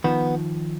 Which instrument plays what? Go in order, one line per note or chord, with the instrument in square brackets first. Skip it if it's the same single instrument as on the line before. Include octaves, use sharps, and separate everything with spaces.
[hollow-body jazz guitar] D#3 F3 [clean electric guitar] B3